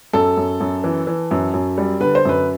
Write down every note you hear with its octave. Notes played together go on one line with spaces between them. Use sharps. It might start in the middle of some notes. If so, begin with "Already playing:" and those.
F#2 A4
F#2
F#2
E3
E3
F#2
F#2
G3
D3 B4
C5
F#2 B4